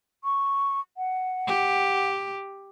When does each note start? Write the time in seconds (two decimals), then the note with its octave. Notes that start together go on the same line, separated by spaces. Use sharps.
0.24 C#6
0.97 F#5
1.47 G4